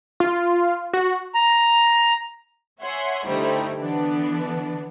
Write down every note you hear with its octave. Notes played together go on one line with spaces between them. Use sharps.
F4
F#4
A#5
C#5 E5 F#5 G#5 C6
D3 G3 A3 D#4 E4 C5
D3 E3 B3 D4